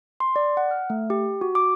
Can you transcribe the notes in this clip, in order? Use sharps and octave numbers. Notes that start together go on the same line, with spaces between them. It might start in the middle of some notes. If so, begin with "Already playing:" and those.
C6
D5
F#5
F6
A3
G4
F#4
D6